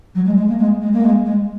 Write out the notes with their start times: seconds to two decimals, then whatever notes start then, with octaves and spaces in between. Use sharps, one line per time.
0.15 F#3
0.26 G#3
0.37 G#3
0.48 A#3
0.59 G#3
0.81 G#3
0.93 A#3
1.03 G#3
1.25 G#3